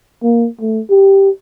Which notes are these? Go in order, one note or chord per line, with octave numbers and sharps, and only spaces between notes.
A#3
A3
G4